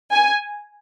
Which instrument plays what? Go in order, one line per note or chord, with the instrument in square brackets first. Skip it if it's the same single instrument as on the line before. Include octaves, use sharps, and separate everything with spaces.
[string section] G#5